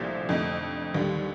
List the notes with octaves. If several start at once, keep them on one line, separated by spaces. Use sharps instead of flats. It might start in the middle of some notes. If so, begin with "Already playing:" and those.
Already playing: C2 A#2 F3 A3 D4
F2 D3 A3 D#4
D#2 D3 G3